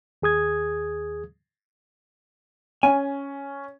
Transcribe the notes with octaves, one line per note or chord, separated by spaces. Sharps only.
D#2 G#4 D#6 G#6
C#4 G#5